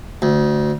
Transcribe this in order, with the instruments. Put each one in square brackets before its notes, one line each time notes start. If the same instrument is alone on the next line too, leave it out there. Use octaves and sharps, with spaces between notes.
[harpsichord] D2